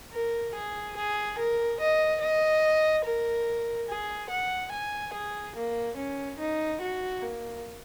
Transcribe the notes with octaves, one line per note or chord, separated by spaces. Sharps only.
A#4
G#4
G#4
A#4
D#5
D#5
A#4
G#4
F#5
G#5
G#4
A#3
C#4
D#4
F#4
A#3